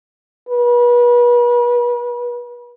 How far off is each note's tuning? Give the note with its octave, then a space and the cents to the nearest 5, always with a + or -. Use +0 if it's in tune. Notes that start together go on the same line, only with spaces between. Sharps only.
B4 -35